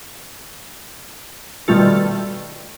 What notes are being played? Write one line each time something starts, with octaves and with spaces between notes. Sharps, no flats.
B2 D#3 G3 A3 F4 A4